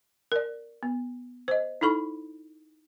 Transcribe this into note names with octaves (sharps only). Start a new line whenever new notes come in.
A#4 D5
B3
C5 D#5
D#4 E4 A4 B5 C#6